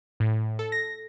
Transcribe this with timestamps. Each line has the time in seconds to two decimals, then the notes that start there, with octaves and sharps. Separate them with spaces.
0.20 A2
0.59 A4
0.72 A#6